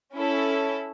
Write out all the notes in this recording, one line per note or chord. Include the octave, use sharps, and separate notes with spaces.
C#4 E4 A4